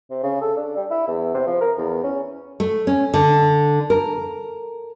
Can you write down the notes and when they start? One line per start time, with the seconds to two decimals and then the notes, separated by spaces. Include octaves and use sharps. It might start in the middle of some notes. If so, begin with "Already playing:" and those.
0.10 C3
0.23 C#3
0.41 A4
0.56 D4
0.76 G3
0.90 E4
1.08 E2
1.34 C3
1.47 F3
1.61 A#4
1.78 E2
2.04 C#4
2.60 A3
2.87 C#4
3.14 D3
3.90 A#4